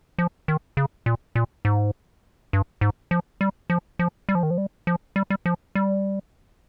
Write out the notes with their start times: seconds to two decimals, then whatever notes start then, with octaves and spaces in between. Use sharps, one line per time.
0.18 F3
0.48 D#3
0.77 C#3
1.06 A#2
1.36 A#2
1.65 G#2
2.53 G2
2.81 G#2
3.11 F3
3.41 G3
3.70 F3
3.99 F3
4.29 G3
4.35 F3
4.43 D#3
4.51 F3
4.58 G3
4.87 F3
5.16 G3
5.30 G3
5.46 F3
5.75 G3